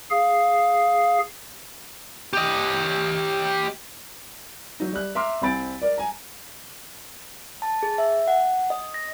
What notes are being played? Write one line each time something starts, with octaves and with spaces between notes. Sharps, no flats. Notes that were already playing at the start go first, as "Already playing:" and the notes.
G#4 F5
G4 D#5
F#3 D#4
G3 F#6
E5 A#5 C6 D6 F6
C2 C4 G#5 B5 A6 D7
A#4 D5
G#5 A#5
A5
G#4
E5
F#5
D#5
A#6